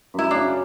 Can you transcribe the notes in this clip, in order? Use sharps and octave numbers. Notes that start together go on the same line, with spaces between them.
F#2 E4
C#3 D4